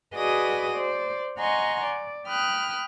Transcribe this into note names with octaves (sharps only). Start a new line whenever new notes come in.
F#4 G#4 B4 D5 D#5 D#6
C5 D5
D#5 F#5 G#5 A#5 C6 C#6
D5
G5 B5 D#6 F6 F#6